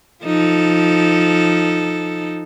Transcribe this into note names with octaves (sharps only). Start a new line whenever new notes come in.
F3 D#4 A4